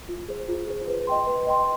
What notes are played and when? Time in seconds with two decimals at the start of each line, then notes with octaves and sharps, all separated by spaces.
0.09 F4
0.29 G#4 C5
0.48 F4
0.67 G#4 C5
0.88 B4
1.07 D#5 G5 C6
1.27 B4
1.47 D#5 G5 C6